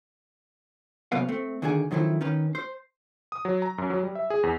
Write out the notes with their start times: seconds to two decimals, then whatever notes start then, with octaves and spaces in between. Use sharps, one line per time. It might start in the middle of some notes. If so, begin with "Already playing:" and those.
1.12 F#2 C3 A3 B3 B4 F5
1.29 A3 C4
1.62 D2 D3 D#3 D4 G#4 G#5
1.91 F#2 D#3 F3 A3 E4
2.21 D#3 C#4 B4
2.55 C5
3.32 D#6
3.45 F#3
3.62 A#5
3.78 F#2
3.90 F#3
4.03 G3
4.15 E5
4.30 G#4
4.43 E2